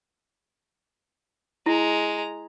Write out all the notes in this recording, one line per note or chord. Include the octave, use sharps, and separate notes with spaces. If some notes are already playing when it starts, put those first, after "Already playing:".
G#3 E4 A#5